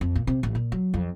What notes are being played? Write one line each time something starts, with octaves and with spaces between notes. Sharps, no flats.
F2
A#2
C3
A1
A#2
F#3
F2